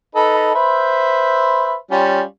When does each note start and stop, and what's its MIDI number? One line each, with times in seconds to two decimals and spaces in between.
0.15 0.53 63
0.15 0.53 69
0.15 0.53 71
0.55 1.75 71
0.55 1.75 72
0.55 1.75 76
1.91 2.21 55
1.91 2.21 61
1.91 2.21 65